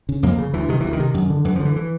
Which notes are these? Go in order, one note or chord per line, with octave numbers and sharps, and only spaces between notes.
C#3
F2 A#3
C#3
D2 E3
C3 D#3
D2 E3
D#3
C3
F#2
D3
F#2 E3
D3 F3
E3
E3